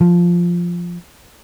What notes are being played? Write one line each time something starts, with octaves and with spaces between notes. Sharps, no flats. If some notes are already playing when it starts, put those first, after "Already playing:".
F3